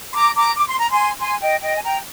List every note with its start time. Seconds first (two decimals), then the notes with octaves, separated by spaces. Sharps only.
0.11 C6
0.14 A#5 D6
0.35 A#5 D6
0.56 D6
0.67 C6
0.79 A#5
0.90 G#5 C6
1.19 G#5 C6
1.41 D#5 G5
1.62 D#5 G5
1.75 G#5
1.83 G5 A#5